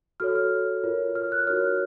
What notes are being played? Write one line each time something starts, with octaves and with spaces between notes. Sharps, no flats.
F#4 A4 C#5 F6
F6
F4 A#4 C#5
F6
F#6
D#4 F#4 A#4 C#5 F6